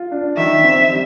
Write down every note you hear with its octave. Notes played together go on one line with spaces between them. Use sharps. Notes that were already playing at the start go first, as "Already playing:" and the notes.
Already playing: F4
D4
D#3 E5
C4
G3